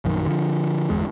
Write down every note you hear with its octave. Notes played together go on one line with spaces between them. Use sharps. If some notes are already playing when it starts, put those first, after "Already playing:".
A#1 F#2 D#3
D3 F3
G1 E2 G#3